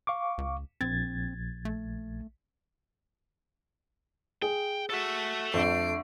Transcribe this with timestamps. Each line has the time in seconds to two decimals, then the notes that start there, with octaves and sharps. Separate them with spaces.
0.07 F5 C#6 D6
0.38 C#2
0.81 A#1 C4 G#6 A6
1.65 A3
4.42 G#4 G5
4.90 F#4 A4 E5
5.54 F2 D3 A3 C7 D7